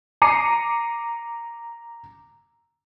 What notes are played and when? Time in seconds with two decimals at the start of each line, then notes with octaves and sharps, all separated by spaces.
0.22 A#5 D6 C7 C#7 D#7